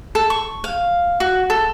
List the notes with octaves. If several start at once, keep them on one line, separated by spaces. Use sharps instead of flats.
A4
C#6
F5
F#4
A4